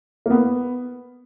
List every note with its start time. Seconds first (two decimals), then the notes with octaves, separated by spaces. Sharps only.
0.26 A#3
0.30 B3